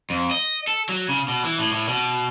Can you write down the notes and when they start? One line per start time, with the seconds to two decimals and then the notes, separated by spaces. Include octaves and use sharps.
0.10 F2
0.31 D#5
0.68 A4
0.89 F#3
1.09 C#3
1.28 B2
1.44 E3
1.59 A2
1.72 A2
1.89 B2